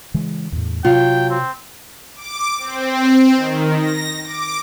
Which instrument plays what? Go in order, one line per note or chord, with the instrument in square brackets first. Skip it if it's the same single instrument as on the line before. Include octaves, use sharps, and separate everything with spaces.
[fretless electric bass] C#3 E3 G#3
E2 A2
[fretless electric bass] C3 [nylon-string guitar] F#3 F4 [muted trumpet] G5
[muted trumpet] C4
[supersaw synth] D6
C4
D#3
A#6
D6